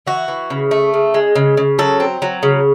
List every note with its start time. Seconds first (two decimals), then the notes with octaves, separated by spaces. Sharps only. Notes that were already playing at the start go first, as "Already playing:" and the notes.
0.07 E3 F#4
0.28 E3
0.50 C#3
0.71 A3
0.94 C#3
1.14 G#3
1.35 C#3
1.57 C#3
1.79 F#3 A4
2.00 C4
2.22 F#3
2.43 C#3